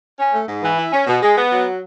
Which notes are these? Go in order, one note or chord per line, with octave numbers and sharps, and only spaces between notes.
C#4
A3
G#2
E3
E4
C#4
B2
G#3
B3
F#3